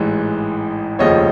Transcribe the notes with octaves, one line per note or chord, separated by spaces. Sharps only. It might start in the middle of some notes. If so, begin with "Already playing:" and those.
Already playing: A1 G#2 E3 G#3
F1 D#2 C#3 F3 C#5 D#5